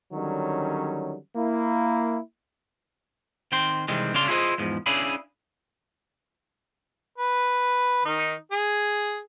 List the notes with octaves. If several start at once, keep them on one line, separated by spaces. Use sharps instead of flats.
D3 D#3 F#3 G3 C#4
A#3 E4
D#3 C4 G5 C6
C3 D#3 E3 G3 G#3 C4
C#3 D4 C#5 D5 F5 C6
E4 F4 G#4 A4 C5 D#5
E2 G#2 F3
C#4 D4 E4 G#4 F5 B5
B4
D#3 D#4
G#4